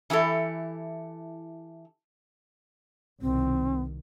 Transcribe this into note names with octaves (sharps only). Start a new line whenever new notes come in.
E3 E4 G4 A4
C2 B2 D#3 C4